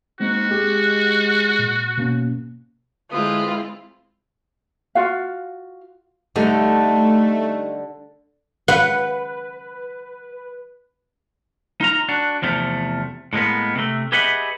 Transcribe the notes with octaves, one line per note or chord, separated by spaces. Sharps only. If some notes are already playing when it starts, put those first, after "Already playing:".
G#3 A#3 C4 D#4 F#4
G#3 G4
A#2
B2 A#3 C#4
D3 G#3 C4 E4 F4 B4 D#6
F4 F#4 F5
D3 G3 A3 D#4
B4 F#5
D#4 F4 A#5
D4 F#4
E2 C3 F3 A3
A2 G#3 A#3 B3
C3 A3
G4 G#4 B4 D#5 E5 F#5